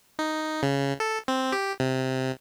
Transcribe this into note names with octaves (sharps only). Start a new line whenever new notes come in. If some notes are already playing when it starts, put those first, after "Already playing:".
D#4
C#3
A4
C4
G4
C3